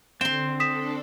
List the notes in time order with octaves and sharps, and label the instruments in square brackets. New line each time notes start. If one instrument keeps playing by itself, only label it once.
[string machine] D3 [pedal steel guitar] C4 [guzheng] G5 C6 [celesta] E7
[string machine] D4 A4 [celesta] D#6 B6 E7